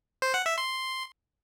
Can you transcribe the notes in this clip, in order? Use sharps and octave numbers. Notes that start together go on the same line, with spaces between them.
C5
F#5
E5
C6